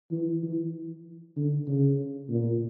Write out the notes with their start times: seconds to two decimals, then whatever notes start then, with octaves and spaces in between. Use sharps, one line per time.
0.11 E3
0.43 E3
1.37 D3
1.67 C#3
2.30 A#2